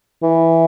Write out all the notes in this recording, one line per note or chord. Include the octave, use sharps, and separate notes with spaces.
E3